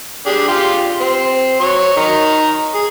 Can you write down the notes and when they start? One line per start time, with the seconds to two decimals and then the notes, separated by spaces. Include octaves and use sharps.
0.26 D4 G4 G#4
0.48 F4 G4
1.01 C4
1.60 F#3 C#5 C#6
1.96 D#3 D#4 A#5
2.74 G#4